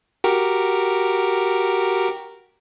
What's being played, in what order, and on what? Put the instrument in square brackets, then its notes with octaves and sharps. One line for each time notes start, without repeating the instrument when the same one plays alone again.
[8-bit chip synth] F#4 G4 A#4